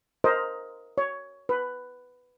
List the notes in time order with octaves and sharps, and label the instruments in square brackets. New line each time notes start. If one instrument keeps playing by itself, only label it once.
[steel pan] A#4 C5 D#5
C#5
B4